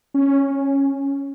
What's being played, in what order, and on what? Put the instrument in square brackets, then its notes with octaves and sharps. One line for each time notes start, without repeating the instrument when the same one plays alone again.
[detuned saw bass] C#4